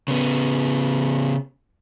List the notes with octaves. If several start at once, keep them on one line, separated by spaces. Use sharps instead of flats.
C#3 B3